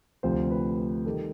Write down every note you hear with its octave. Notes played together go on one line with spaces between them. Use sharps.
D2 C3 F3 C5
B4
B4
D#3 G3 A4